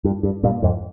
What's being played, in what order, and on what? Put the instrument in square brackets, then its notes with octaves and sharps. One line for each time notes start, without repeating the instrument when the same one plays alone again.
[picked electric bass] G2
G2
G2 A#2
F2 G#2